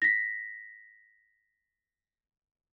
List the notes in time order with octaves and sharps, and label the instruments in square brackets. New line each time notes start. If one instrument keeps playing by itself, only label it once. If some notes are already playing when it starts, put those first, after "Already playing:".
[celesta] A#6 B6